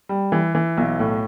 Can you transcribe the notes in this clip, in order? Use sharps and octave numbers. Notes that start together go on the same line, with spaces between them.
G3
E3
E3
B1
A2